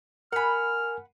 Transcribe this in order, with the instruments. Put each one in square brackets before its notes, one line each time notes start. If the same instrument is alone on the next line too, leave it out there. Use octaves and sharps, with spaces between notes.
[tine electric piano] A#4 G#5 [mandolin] F#5 B5 [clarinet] F6